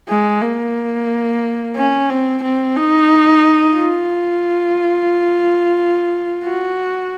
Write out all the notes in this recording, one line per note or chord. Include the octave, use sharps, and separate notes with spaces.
G#3
A#3
C#4
C4
C4
D#4
F4
F#4